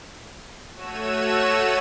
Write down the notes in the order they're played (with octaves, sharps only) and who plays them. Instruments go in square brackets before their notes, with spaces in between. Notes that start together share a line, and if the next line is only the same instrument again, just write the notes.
[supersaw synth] A3 F#4 C#5 E6 D#7 E7